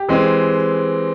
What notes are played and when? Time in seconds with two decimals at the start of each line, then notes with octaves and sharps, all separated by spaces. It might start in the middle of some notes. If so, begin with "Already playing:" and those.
Already playing: G4
0.09 E3 G#3 C4